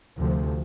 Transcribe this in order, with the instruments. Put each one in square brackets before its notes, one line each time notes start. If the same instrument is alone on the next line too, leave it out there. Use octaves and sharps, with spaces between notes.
[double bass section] D2 C3 F3